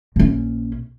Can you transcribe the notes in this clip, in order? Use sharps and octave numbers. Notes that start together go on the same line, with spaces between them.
A#1 C#4